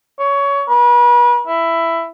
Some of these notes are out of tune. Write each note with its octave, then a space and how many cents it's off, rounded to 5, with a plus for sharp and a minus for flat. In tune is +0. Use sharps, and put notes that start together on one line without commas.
C#5 +20
B4 -40
E4 +10